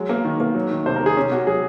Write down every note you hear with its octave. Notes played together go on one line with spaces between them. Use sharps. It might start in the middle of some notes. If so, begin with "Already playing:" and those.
Already playing: F#3 G#3
A#3
D#3
A#3
F#3
D#3
C3 C5
A#4
D#3
G#4
C3 C#4
C3 F#4
F#3 G#4